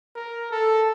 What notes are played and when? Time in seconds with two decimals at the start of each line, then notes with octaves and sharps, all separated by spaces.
0.15 A#4
0.51 A4